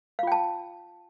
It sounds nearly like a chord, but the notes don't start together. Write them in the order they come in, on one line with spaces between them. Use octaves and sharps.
F5 F4 G5 A5